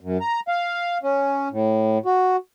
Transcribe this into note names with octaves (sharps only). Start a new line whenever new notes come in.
F#2
A#5
F5
C#4
A2
F#4